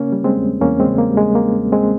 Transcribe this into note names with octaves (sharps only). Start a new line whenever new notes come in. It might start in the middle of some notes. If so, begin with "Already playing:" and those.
Already playing: C#3 A#3 C#4
G3
G#3 C4
E2
E2 A#3 C#4
G#3 C4
C#3
A#3
G3
G#3
E2 A#3
E2
G#3 C4